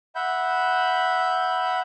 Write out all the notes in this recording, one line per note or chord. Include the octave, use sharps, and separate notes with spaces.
E5 F#5 B5 G6